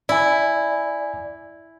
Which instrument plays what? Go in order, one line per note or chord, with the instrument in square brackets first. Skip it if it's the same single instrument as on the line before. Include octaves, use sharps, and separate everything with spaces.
[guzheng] E4 [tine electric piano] D5 G#5